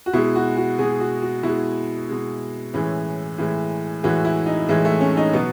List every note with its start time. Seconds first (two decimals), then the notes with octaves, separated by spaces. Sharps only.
0.06 F#4
0.13 B2 G#3 E4
0.35 F#4
0.57 F#4
0.78 B2 G#3 G#4
1.00 F#4
1.22 F#4
1.43 B2 G#3 E4
2.08 B2 G#3
2.73 A2 E3 G#3 C#4
3.38 A2 E3 G#3
4.03 A2 E3 G#3 F#4
4.25 E4
4.46 D#4
4.68 A2 E3 G#3
4.85 A3
5.01 C#4
5.17 D#4
5.33 B2 F#3 B3